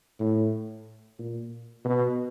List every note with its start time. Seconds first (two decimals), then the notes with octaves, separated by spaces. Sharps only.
0.20 A2
1.19 A#2
1.85 B2